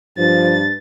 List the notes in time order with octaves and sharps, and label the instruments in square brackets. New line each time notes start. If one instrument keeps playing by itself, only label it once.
[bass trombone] G2 [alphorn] F3 [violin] A6